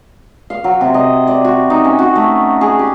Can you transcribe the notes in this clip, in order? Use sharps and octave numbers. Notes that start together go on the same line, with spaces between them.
F5
F#3
C3
D#5
D5
F#4
D#4
C#4
F#4
A3
G#4
G4